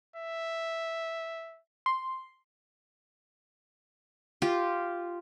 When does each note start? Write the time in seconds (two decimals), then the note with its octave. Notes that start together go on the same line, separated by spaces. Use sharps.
0.16 E5
1.86 C6
4.42 F4 G4